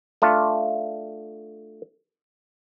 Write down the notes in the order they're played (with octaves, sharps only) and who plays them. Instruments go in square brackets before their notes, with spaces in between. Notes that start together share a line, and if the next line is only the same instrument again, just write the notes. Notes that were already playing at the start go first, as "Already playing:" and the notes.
[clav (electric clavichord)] A3 D4 F4